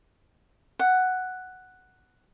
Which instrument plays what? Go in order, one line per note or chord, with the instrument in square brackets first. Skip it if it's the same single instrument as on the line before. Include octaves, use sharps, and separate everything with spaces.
[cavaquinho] F#5